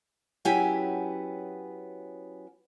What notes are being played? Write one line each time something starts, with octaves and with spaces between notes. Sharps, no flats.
F#3 B3 C#4 E4 G4 G#5